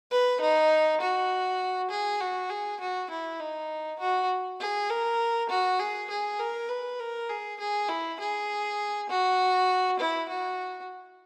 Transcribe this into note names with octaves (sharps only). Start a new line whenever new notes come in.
B4
D#4
F#4
G#4
F#4
G#4
F#4
E4
D#4
F#4
G#4
A#4
F#4
G#4
G#4
A#4
B4
A#4
G#4
G#4
E4
G#4
F#4
E4
F#4